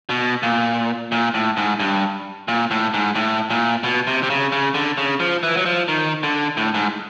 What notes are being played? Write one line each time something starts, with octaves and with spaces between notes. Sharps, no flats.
B2
A#2
A#2
A2
G#2
G2
A#2
A2
G#2
A2
A#2
B2
C3
C3
C#3
C#3
D3
C#3
F3
E3
F#3
F3
D#3
D3
A2
G#2